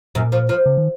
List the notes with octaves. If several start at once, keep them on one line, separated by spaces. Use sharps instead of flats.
F#2 A#2
F3
F3
C#3
D#3